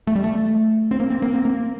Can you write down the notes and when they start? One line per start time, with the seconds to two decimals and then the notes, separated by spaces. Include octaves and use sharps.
0.07 A3
0.15 G3
0.24 A3
0.91 C4
1.00 A#3
1.10 C4
1.22 A#3
1.34 C4
1.45 A#3